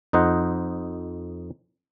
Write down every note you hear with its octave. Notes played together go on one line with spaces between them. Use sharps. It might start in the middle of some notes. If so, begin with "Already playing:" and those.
F2 D#4 C5 D#5 F#5